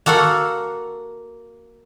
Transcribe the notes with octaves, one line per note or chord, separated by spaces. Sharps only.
A#3 F#4 A4 F5 F#5